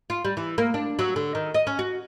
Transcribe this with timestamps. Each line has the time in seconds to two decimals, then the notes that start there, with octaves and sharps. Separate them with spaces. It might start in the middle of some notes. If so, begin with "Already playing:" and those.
0.10 F4
0.25 G3
0.37 E3
0.58 A#3
0.74 D4
0.99 F#3
1.16 D3
1.35 D#3
1.54 D#5
1.67 C#4
1.79 F#4